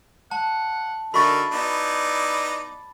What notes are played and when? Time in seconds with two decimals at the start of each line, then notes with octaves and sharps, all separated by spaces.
0.31 F#5 A5
1.14 D3 D#4 F#4 A#4 E5 B5 C#6 A6
1.51 B3 D#4 E4 D5